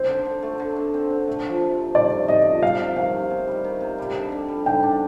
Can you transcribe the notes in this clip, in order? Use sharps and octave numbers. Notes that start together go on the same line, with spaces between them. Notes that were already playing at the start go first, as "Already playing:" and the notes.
Already playing: C4 C5
D3
D3
A3
D3
D3
C4
D3
A3
F3
C3
C3
C3 D5
A3
C3 D#5
F3
C3 F5
C3
D#3 F5
C3
C3
G3
D#3
C3
G3
D3
D3
G3
D3 G5
D4